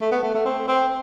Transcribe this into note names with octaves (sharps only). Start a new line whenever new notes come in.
A3
B3
A3
A3
C4
C4